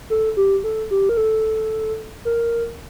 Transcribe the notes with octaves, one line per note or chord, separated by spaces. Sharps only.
A4
G4
A4
G4
A#4
A4
A#4